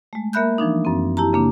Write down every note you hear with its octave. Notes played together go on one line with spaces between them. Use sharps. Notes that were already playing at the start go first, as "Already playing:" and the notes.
G#3 A3
A#3 A#4 E5 B5 F#6 G6
E3 F3 D4 D#4
F#2 C4
E4 G4 A5 A#5
C#3 A#3 D4